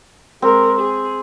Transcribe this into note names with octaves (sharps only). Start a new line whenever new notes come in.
G#3 C4 A#4
G#4